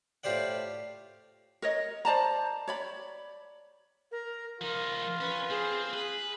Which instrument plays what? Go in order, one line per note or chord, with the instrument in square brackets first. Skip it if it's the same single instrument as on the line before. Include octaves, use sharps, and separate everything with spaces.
[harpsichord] A2 F4 G4 C5 D5 F#5
[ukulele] A#4 C#5 D#5
C5 D5 A5 A#5
C#5 D5 B5
[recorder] A#4
[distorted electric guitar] F3 D#4 [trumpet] F4 [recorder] A#4
[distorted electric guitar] C#4 [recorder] B4
[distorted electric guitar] C4 [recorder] G#4
[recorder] G#4 [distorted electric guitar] B4